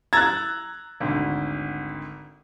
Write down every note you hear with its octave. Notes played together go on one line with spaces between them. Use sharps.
A#5 E6 F#6 G#6 A6
G#1 D2